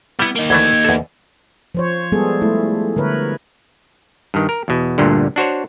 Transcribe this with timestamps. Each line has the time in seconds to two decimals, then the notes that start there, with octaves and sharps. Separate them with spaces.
0.19 G3 B3 E4
0.35 A#3 D#4
0.50 D2 E3 A3 G#6
0.84 E2 A4
1.75 F3 C5 C#5
2.12 G3 G#3 B3 G#4 A4
2.42 A3 E4
2.96 D3 A#4 B4 C#5
4.34 G2 D#3
4.49 A#4
4.68 E2 B2
4.98 D2 G2 A#2 D3
5.36 D4 F#4 C5 C#5